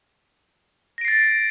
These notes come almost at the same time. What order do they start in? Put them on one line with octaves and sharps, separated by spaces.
A#6 D7 C7 A6